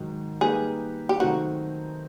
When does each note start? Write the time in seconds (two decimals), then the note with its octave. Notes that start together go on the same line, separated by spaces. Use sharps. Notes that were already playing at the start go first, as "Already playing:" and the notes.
Already playing: G#2 D#3 F#3
0.41 G3 A#3 D#4 G4 G#4 B4
1.09 G4
1.20 D#3 F#3 A3 C4 D#4 F#4